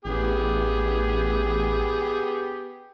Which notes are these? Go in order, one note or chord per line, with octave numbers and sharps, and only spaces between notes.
A1 B3 G4 G#4